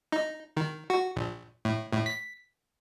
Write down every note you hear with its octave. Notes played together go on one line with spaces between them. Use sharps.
D#4
D#3
F#4
A#1
A2
A2
B6